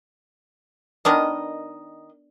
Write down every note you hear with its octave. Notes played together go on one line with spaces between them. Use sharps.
D#3 B3 D4 A#4 D#5